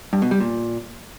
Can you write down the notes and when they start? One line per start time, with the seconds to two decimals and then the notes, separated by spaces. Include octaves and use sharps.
0.13 G2
0.22 B2
0.31 G3
0.40 A#2